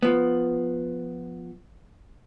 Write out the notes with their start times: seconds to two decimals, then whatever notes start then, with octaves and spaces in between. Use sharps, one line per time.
0.03 F3 B3